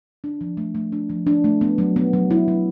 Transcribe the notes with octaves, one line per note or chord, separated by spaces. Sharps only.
D4
F3
A3
A3
D4
F3
D4
A3
B3
F#3
B3
F#3
E4
F#3